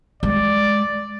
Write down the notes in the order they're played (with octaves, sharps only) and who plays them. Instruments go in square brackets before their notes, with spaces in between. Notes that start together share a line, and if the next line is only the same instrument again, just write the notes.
[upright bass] G#3 [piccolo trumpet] D5